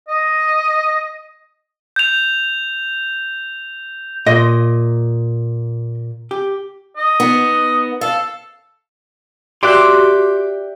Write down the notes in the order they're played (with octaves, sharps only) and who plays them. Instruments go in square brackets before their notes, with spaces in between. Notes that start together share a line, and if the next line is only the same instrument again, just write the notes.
[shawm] D#5
[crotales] G6 F7
[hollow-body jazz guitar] A#2 [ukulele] D#5
[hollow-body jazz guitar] G4
[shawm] D#5
[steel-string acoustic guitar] B3 D#4 F#5
[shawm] A4 [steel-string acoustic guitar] F5
[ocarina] F#4 [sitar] G4 [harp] D5 E5 F#6 [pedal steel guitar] C6 D6